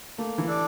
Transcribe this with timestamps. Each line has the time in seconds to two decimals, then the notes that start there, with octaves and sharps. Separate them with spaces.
0.18 A3 A#3
0.38 E3
0.47 D4 A4 D5